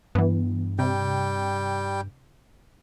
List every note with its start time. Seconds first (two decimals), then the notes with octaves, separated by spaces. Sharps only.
0.15 G2 E3 B3
0.79 C3 G3 G5